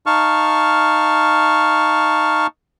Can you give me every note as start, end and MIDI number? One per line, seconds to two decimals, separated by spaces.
0.06 2.47 63
0.06 2.47 77
0.06 2.47 81
0.06 2.47 85
0.06 2.47 89